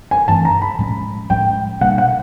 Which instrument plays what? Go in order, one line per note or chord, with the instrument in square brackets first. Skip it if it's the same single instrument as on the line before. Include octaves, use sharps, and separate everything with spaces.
[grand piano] G#5
[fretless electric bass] G2 E3 A3 C4 [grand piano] A5
[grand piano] A#5
B5
[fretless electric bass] A2 F3 G#3 C#4
[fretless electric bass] A2 F3 G#3 C#4 [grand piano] G5
[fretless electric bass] B2 G3 A#3 D4 [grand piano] F#5
[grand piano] F#5